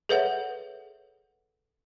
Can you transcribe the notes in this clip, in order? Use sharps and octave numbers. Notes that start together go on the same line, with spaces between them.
G#4 A4 B4 C#5 E5 F#5